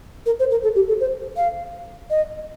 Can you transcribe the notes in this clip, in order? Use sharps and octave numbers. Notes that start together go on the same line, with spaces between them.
A#4
C5
A#4
A4
G4
A4
C5
F5
D#5